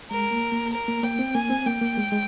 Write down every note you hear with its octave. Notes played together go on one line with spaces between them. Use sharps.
G#3 A#4
A#3
A#3
A#4
A#3
A#3 G5
C4
A#3 G#5
C4
A#3 G5
A#3
G#3
G#3